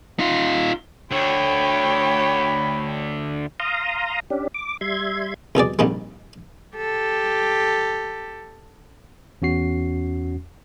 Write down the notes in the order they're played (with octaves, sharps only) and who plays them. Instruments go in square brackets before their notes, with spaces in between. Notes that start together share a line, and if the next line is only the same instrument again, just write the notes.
[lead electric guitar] D#4 F4
[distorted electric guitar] D2 D3 [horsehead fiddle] C#5 G5 [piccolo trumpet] B5
[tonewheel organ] F5 A#5 C6 D#6
C#4 D4 G4
D6
G3 E5 C6 G#6
[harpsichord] C2 B2 G#4 D5
A#1 F2 A#2 D#3 G3
[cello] G4 A4
[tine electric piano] E2 C#4 F#4 C7